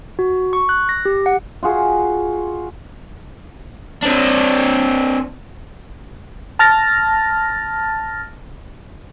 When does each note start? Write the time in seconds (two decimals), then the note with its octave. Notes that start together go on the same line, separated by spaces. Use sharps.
0.19 F#4
0.53 C#6
0.69 F#6
0.89 A#6
1.05 G4
1.26 F#5
1.63 F4 F#4 G#4
4.03 C4 D4
6.59 A5 F6 A6 A#6